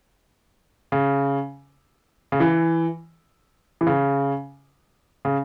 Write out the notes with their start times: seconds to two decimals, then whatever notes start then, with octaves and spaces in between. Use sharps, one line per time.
0.92 C#3
2.32 C#3
2.40 E3
3.81 E3
3.87 C#3
5.25 C#3